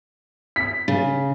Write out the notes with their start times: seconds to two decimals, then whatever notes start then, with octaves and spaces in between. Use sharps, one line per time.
0.56 B6
0.88 C#3